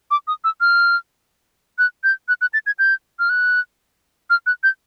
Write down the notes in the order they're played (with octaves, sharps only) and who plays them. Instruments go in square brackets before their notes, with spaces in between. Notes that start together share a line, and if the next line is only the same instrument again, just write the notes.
[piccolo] D6
D#6
E6
F6
F#6
G6
F#6
F#6
A6
G#6
G6
F6
F#6
F6
F#6
G6